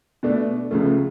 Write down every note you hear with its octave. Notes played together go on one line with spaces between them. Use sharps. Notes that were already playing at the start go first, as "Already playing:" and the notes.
B2 A3 D4
C#2 C#3 F3 A3 F4